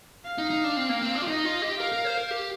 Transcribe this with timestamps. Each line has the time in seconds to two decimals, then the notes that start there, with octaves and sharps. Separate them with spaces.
0.25 F5
0.38 D#4
0.50 D#4
0.64 D4
0.77 C4
0.89 A#3
1.02 C4
1.15 D4
1.22 F4
1.27 D#4 D#5
1.45 F4
1.62 G4
1.79 A#4 F5
1.92 A#4
2.05 C5
2.17 A#4
2.31 G4